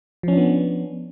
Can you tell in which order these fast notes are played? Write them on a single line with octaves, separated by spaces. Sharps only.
F3 C#4 D4 B3